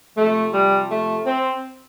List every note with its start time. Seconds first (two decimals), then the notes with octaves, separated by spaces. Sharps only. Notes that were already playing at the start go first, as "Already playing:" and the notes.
0.15 C3 F3 A3
0.52 G3
0.89 A3
1.25 C4